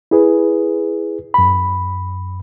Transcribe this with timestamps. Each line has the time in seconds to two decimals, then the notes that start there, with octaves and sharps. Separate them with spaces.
0.11 E4 G#4 B4
1.34 F#2 B5